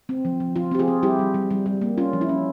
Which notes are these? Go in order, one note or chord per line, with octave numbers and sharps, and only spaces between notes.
C4
F3
F3
F3 F4
C4 G4
F4 G#4
C4
G3 E4 G4
G3
G3
G3
G3
A#3
C#4 F4
F3
E4
C#4